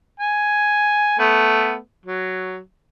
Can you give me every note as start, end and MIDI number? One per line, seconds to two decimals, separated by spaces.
0.20 1.18 80
1.19 1.76 57
1.19 1.76 59
2.06 2.59 54